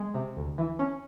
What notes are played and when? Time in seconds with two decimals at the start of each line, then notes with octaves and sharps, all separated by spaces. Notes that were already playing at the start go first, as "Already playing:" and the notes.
Already playing: G#3
0.14 C3
0.37 D2
0.58 E3
0.79 C#4